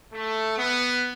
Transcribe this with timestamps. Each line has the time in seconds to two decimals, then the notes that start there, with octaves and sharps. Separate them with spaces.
0.13 A3
0.57 B3